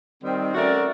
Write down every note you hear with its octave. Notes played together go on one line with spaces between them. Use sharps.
D#3 G3 C4
A3 C#4 F#4 A#4 D5